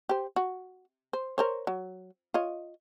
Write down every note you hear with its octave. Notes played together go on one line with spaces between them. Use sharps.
G4 C5
F#4
C5
A#4 C5 C#5
F#3
F4 C#5 D#5